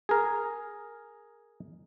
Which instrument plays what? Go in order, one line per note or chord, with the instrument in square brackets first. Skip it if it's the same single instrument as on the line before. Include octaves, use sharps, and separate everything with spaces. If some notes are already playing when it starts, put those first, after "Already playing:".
[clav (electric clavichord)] G#4 A#4